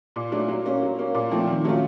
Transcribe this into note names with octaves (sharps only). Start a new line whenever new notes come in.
A#2
F#3 A3 D4
F#3
A#3 C#4
F#3
A#3 C#4
A#2
F3 A3 C4
D#3
F#3 A3 C#4 F4